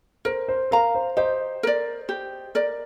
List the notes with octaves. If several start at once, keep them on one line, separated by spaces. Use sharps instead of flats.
A#4 C5
C5
A#4 F5 A#5
C5
G4 C5 D#5
A#4 D5
G4
A#4 D5